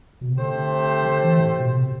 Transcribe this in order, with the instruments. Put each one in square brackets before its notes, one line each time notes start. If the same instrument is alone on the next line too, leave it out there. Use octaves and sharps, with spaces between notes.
[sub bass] B2
C3
[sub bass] D3 [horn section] A3 C4 G4 C5
[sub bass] D3
E3
A2
B2
C3